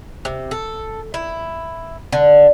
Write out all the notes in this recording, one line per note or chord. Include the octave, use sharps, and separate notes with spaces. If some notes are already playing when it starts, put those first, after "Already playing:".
C3
A4
E4
D3